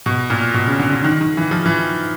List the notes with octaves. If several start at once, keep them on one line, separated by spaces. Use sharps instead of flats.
B2
A#2
B2
C#3
D3
D3
D#3
D#3
E3
F3
E3